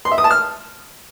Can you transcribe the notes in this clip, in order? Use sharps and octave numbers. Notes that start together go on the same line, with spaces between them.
C6
E5
D#6
A5
F6